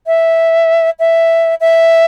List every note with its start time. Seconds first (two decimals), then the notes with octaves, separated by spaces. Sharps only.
0.07 E5
0.99 E5
1.60 E5